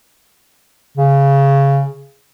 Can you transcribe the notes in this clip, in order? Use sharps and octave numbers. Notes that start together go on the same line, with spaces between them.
C#3